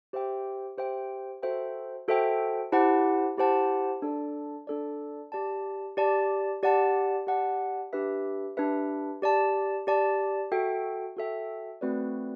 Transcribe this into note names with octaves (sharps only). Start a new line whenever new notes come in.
G4 C5 E5 G5
G4 C5 E5 G5
F#4 A4 C5 E5 G5
F#4 A4 C5 E5 G5
E4 G4 C5 F#5 A5
E4 G4 C5 F#5 A5
D4 A4 D5
D4 A4 D5
G4 D5 A5
G4 D5 A5
G4 D5 F#5 A5
G4 D5 F#5 A5
D4 G4 B4 E5
D4 G4 B4 E5
G4 D5 A5
G4 D5 A5
F#4 A4 E5 G5
F#4 A4 E5 G5
A3 C4 F#4 B4 D5